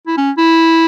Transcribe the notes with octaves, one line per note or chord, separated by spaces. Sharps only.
E4
C#4
E4